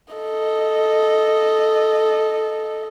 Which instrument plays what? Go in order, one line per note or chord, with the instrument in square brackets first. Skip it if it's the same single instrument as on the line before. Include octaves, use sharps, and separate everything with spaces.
[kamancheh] A4 D#5